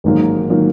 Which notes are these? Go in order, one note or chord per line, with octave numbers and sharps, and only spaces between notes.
A1 G#2 D#3 F#3 A#3
D#3 F#3 A#3